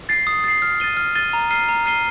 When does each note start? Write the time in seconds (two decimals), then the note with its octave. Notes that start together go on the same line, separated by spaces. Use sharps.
0.09 A6 C7
0.27 D#6
0.44 A6 C7
0.62 F6
0.80 A6 D#7 G7
0.97 F6
1.15 A6 D#7 G7
1.33 A#5
1.51 F6 C7 D#7 G7
1.69 A#5
1.86 F6 C7 D#7 G7